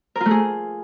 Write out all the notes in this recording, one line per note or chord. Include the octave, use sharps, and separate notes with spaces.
A#4
F4
A3
G#4